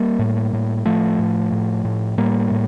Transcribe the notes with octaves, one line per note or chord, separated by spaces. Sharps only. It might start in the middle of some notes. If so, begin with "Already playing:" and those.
Already playing: G3 A#3
A2
A2
A2 F3 A3
A2
A2
A2
A2 G3 A#3
A2